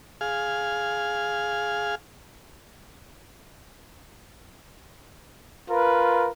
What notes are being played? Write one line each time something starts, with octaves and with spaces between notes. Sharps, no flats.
G#4 F5
F4 A#4 B4